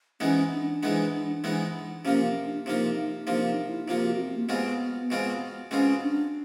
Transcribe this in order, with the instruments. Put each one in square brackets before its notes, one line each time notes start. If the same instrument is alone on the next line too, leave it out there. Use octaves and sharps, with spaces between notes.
[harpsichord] G#2 E3 G#3 B3 [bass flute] C#4
[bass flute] D4
[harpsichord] G#2 E3 G#3 B3
G#2 E3 G#3 B3
[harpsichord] C3 F3 A#3 [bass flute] C#4
[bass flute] D4
[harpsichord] C3 F3 A#3 [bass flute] D#4
[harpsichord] C3 F3 A#3 [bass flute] D4
[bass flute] D#4
E4
[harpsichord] C3 F3 A#3 [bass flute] F4
[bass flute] F#4
C4
A#3
[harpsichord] B2 G#3 C4 F4 [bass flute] B3
[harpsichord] B2 G#3 C4 F4
[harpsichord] B2 G#3 C4 F4 [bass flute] C#4
[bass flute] D4